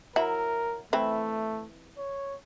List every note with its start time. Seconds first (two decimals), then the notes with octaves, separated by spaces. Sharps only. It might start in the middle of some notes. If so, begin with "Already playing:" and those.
0.16 F#3 E4 A#4
0.93 E3 A3 C4 E4
1.98 C#5